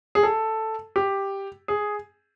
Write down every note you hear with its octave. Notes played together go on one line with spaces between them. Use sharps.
G#4
A4
G4
G#4